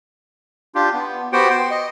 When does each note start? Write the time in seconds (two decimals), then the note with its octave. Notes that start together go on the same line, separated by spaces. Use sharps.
0.75 D4 F4 G4
0.93 B3
1.32 B3 F#4 G4 C5 F#5 G5
1.50 G5 C6
1.70 D#5